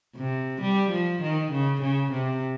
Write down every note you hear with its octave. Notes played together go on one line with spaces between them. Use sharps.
C3
G3
F3
D#3
C#3
C#3
C3